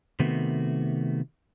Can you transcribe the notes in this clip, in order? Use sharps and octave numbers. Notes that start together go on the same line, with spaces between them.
C3 D#3 A3 B3 F#4